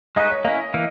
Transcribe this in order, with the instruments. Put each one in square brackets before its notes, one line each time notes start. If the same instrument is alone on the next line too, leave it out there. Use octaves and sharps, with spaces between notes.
[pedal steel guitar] G#3 D#4 F#4 B4 [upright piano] D#5
[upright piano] C#5
[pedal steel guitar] A#3 C#4 E4 [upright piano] D#5
[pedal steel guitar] E3 A#3